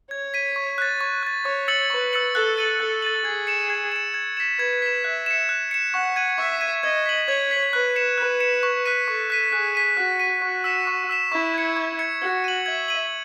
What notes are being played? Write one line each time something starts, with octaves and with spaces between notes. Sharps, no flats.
C#5 G#6
B6 D#7
C#6
F#6 A6
C#6
F#6 A6
C#5 C#6
E6 A6 C#7 F#7
B4 C#6
E6 A6 C#7 F#7
A4 F#6
A6 D#7 F#7
A4 F#6
A6 D#7 F#7
G#4 G#6
C#7 E7
G#6
C#7 E7
G#6
B6 E7
B4 G#6
B6 E7
E5 F#6
C#7 E7
F#6
C#7 E7
F#5 C#6
G#6 D#7
E5 C#6
G#6 D#7
D#5 G#6
B6 F#7
C#5 G#6
B6 F#7
B4 F#6
C#7 E7
B4 F#6
C#7 E7
C#6
F#6 B6 D#7
A4 C#6
F#6 B6 D#7
G#4 F#6
B6 D#7
F#4 F#6
B6 D#7
F#4 C#6
E6 B6 E7
C#6
E6 B6 E7
E4 C#6
G#6 C#7
C#6
G#6 C#7
F#4 G#6
D#7 F#7
E5 G#6
D#7 F#7